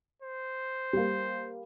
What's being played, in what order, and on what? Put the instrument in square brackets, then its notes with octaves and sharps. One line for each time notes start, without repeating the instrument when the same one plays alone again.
[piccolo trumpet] C5
[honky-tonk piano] G3 A#3